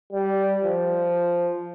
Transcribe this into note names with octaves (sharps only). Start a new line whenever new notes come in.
G3
F3